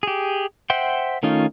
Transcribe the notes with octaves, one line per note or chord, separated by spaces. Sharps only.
G4 G#4
C5 E5 F#5 G5 C6
D#3 A3 C#4 D#4 F4